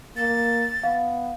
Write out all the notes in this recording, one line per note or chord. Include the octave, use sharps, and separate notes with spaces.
A#3 A6
B3 F5